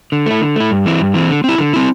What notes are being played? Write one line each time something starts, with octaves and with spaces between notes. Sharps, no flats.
D3
A3 E4
D3
A3 E4
G2
E3 C4 E4
G2
E3 C4 E4
D3
C4 E4
D3
C4 E4